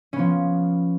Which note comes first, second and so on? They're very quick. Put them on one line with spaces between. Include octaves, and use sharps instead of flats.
C#4 B3 F3